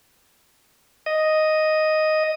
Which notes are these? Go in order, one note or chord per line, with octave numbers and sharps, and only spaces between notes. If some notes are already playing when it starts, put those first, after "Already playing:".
D#5